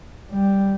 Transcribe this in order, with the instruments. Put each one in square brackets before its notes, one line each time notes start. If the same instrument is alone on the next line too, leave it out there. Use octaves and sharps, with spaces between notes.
[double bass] G3